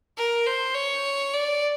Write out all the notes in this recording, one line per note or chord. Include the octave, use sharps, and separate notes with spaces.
A#4
C5
C#5
D5